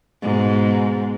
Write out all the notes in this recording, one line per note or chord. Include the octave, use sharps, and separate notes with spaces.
G#2 B2